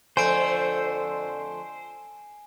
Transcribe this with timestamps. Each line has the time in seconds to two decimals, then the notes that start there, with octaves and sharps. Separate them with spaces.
0.17 F2 D3 A3 C5 G#5 D7